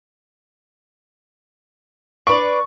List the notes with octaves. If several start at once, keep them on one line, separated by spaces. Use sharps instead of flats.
D4 B4 D5 C#6